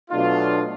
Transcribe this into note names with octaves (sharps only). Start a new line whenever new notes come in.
B2 F#3 A3 D4 F4